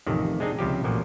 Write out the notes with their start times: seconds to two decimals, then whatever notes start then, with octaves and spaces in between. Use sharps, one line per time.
0.07 A1 F2 C3 D#3
0.40 G#3 C4 D4 D#4 G#4
0.59 C#2 C3 F3 G4
0.84 A1 A#2 F3 F#3